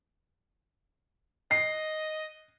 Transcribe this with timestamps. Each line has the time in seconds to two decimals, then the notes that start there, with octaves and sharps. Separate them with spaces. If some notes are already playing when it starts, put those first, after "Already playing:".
1.51 D#5 C7